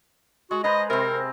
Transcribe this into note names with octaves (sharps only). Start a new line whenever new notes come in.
G#3 F#4
B4 C5 D#5 A#5
C3 C4 A#4